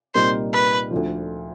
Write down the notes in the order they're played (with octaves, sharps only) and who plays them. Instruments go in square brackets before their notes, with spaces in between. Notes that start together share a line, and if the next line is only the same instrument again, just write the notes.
[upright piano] C2 A#2 G3 A#3 D#4 [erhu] C5
[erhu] B4
[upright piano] D2 D3 F3